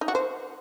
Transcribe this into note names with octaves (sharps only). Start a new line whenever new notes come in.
D#4
F#4
C5